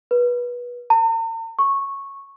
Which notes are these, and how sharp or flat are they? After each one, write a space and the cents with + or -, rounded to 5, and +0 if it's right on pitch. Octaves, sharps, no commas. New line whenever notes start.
B4 -20
A#5 -45
C#6 -10